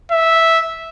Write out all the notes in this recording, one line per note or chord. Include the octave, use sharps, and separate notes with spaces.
E5